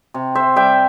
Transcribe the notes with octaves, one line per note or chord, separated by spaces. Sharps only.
C3
C5 E5
G3 E5 G5